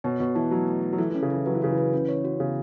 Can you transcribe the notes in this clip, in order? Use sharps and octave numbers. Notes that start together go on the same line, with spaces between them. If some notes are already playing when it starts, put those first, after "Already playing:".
B2 C#5
B2 F#4
E3 A5
F#3 A3
A3
A3
F#3
E3 A4
E3 C#4
C#3
E3 A4
F#3 B4
E3
C#3 F#4
E3
B4
C#4
C#5
F#4
C#3 B3